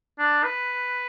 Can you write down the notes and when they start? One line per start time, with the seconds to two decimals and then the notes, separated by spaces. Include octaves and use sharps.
0.19 D4
0.44 B4